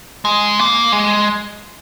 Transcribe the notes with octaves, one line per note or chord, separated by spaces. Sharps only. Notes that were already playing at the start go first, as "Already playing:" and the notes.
G#3
A#3
G#3